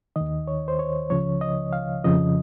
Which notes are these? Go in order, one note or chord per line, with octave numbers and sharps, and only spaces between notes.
D#2 D#3 D#5
C#5
C5
C#5
C#2 C#3 F3 C#5
D#5
F5
F2 C#3 F3 D#5